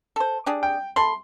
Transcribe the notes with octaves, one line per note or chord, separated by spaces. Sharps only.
A4 C5
D4 G4 G#4
G5
A4 E5 B5 C6